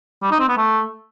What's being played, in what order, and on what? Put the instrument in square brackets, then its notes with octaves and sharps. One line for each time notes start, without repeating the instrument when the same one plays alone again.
[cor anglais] G3
D#4
C4
B3
A3